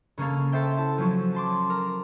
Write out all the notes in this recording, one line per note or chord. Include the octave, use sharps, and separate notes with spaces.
C#3 A#3 C#4 A4 F5
A4 C5 E5 G5
E4 A5
F3 F#3 C#4
A5 C6 D6
A#4